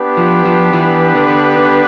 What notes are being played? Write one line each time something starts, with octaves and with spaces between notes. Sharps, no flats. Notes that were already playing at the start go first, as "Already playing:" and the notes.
Already playing: B3 D4 G4 B4
F3
F3
E3
D3
D3